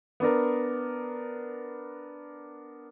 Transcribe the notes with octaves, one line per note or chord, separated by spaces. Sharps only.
B3 D4 A#4